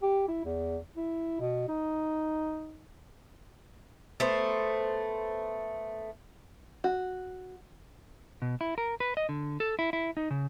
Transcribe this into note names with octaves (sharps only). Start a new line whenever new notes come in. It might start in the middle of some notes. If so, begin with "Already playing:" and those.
G4
E4
E2
E4
B2
D#4
A3 B3 C5
F#4
B2
E4
A#4
B4
D#5
D3
A4
E4
E4
D#4
C#3